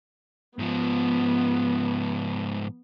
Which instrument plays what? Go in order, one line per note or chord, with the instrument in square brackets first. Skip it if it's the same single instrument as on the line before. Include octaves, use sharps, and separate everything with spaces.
[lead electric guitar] G#2 F3 [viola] B3